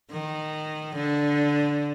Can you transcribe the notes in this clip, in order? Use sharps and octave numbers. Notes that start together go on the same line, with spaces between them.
D#3
D3